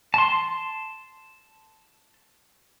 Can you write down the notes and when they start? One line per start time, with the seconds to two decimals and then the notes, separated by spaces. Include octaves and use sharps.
0.14 A5 C6